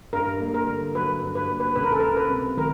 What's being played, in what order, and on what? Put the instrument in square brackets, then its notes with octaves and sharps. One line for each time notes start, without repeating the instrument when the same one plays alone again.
[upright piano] G2 [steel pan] A#4
[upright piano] A#3
[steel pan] A#4
[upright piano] D3
[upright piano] F#3 [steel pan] B4
[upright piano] G2
[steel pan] B4
[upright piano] A#3
[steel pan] B4
[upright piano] C#2 [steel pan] B4
[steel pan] A#4
A4
[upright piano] C#2 [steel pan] A#4
[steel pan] B4
[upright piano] C3
[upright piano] D#3 [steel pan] A#4